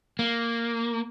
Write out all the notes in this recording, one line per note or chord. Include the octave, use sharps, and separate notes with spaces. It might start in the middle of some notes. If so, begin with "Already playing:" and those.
A#3